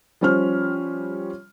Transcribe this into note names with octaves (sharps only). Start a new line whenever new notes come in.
F3 G3 C#4 C5 F6